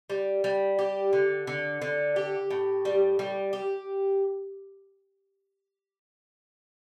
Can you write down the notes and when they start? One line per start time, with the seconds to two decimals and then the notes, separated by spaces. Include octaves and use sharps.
0.10 G3
0.44 G3
0.79 G4
1.13 D3
1.47 D3
1.82 D3
2.16 G4
2.50 A2
2.85 G3
3.19 G3
3.53 G4